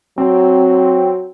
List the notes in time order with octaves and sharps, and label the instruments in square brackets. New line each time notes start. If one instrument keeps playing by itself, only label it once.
[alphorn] F#3 [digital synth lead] C4